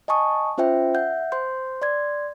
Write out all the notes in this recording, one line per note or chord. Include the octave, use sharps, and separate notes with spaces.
D#5 G#5 A5 C#6 D#6
C#4 F4 C5 E5 G5
E5 F#5 G6
C5 C6 G6
D5 C6 G#6